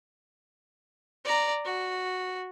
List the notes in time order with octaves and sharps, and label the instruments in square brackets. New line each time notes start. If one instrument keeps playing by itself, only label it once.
[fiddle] D5 A#5
F#4